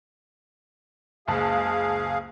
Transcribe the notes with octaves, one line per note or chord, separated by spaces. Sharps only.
F#1 C#2 G#4 F5 A5